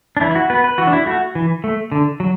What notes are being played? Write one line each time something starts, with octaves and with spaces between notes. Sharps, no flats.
D4
E3 E4
E4
F#4
B3 B4
B4
E3 F#4
D4
E4
A3 F#4
E3
A3
D3
F#3